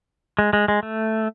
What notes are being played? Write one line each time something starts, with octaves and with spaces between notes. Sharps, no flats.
G#3
G#3
G#3
A3